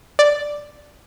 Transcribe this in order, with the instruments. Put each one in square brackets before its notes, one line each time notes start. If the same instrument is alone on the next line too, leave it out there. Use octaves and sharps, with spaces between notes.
[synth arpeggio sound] D5